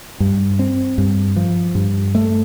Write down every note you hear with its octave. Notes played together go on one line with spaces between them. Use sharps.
G2
C4
G2
F3
G2
A3